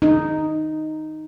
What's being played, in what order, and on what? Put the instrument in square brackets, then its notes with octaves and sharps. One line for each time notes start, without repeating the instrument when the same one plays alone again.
[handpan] D#4